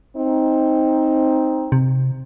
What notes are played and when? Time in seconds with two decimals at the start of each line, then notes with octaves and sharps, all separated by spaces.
0.16 C4 D#4
1.72 C3